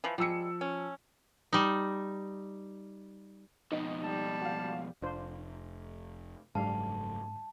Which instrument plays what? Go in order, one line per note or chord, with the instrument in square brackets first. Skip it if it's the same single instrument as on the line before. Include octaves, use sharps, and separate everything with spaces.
[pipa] E3 F3
[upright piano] F3 E6 C#7 [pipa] G3 G#3
[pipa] C#4
[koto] G3 D#4
[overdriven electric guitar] F2 B2 [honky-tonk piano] D#4 D#5
[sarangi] G3 [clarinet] A5
[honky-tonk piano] F#4 F5
[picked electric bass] F1 [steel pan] D4 F4 C5
[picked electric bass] F#1 F#3 A3 [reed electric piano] G#2 [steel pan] G3 D4 F5 [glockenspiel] A5